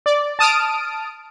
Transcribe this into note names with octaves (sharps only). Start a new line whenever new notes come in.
D5
A5 D#6 F6 D7